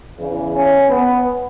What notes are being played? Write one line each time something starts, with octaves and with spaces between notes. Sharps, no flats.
E2 C#3 E3
C#4
B3